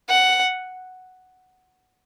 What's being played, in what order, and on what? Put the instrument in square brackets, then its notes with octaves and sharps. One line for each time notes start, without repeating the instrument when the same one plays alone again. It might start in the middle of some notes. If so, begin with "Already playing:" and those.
[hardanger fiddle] F#5